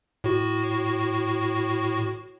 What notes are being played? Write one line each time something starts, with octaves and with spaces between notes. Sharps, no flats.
A2 F#4